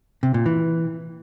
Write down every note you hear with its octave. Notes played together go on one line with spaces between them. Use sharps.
C3
A#2
E3